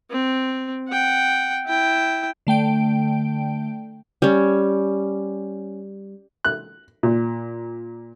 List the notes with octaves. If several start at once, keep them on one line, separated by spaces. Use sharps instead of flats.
C4
F#5 G5
E4 G5
D3 A3 G5 D7
G3 C#4
F#6
A#2